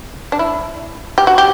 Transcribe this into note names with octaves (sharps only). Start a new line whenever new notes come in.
D4
E4
G4
F#4
G4